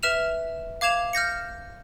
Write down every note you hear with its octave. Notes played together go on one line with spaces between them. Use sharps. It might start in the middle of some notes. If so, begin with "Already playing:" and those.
B4 E5 F6 E7 F7
F5 D6 G#6 E7 F7
F6 G6 A#6 C#7